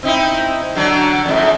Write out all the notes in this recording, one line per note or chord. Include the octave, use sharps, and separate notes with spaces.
C4 D#4 E4
D3 F#3 D4
F2 G#2